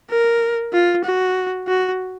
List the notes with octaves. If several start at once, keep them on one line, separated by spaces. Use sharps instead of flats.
A#4
F4
F#4
F#4